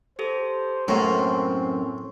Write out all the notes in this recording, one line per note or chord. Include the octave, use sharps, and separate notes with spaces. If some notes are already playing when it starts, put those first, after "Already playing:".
G4 A4 C5
F#2 A2 A#3 C4 C6 C#6